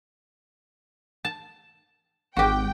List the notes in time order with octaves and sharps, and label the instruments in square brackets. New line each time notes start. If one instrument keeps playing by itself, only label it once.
[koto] A5
[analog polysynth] G#1 [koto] F#4 G4 [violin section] G5